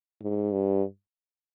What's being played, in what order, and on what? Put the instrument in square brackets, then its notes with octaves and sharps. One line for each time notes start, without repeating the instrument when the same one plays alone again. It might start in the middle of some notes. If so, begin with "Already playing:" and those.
[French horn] G#2
G2